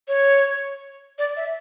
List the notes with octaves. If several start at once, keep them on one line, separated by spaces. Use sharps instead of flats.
C#5
D5
E5